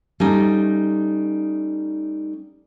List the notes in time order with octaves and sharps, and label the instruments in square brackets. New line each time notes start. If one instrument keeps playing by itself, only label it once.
[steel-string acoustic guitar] G3 A3 C#4 D#4